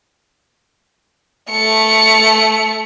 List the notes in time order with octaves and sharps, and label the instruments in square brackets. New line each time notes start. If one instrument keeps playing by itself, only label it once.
[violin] A3 C#7